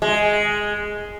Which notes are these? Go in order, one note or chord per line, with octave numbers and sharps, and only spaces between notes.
G#3